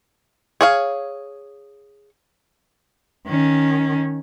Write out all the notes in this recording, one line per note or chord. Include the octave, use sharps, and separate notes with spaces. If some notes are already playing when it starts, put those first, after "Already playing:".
G#4 C#5 F5
D#3 C#4